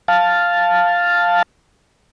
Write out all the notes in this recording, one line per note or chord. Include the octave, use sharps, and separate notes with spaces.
F5 A5